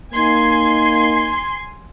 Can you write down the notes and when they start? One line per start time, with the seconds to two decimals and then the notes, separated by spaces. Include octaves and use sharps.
0.14 A#3 D#4 G#5 C6 G#6 C7